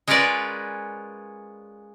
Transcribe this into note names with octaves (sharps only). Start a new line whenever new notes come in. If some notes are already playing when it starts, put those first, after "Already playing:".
G#3 C#4 F4 A#4 B4 D5